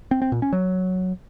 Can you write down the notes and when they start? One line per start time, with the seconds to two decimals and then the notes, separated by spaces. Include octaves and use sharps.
0.11 C4
0.22 C4
0.32 A#2
0.42 C#4
0.53 F#3